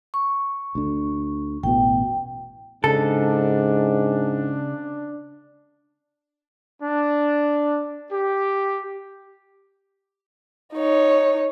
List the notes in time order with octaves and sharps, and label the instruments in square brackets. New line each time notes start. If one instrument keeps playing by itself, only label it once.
[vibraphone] C#6
[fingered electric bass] D2 D3
[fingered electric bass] A1 E2 B2 [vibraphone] G5
[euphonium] G#2 [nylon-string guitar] C#3 [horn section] D4 [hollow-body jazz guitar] A4
[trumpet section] D4
G4
[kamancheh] D#4 C#5